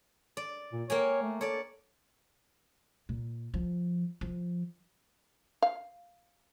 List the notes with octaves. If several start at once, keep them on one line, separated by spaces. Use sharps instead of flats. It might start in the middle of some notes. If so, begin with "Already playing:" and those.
D5
A#2
A#3 C#5 G5 G#5
A3
A4 C#5 D5
A#2
F3
F3
F5